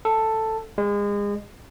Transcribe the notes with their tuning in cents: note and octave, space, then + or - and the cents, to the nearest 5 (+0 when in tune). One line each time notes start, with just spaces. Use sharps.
A4 +5
G#3 -30